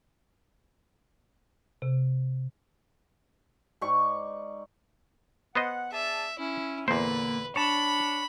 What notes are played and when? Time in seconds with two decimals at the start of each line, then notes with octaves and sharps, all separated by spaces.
1.82 C3
3.81 G#2 D5 C#6
5.55 B3 C5 D#5 F#5
5.92 G#4 D5 E5 A5
6.39 C#4 E4
6.88 E2 A#2 D3 A#3 B4 C5
7.56 D4 C#5 A5 B5